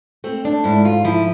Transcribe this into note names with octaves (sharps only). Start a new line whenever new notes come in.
A3 C4
D4
G#2 E4
F4
F3 E4